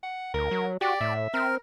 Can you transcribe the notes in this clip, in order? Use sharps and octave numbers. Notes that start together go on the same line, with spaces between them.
F#5
D2 A#4
F#3
F#4 G4 D5
A2 E5
C4 A#4